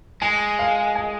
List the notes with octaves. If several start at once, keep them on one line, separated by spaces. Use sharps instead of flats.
G#3 G#5
F5
G#5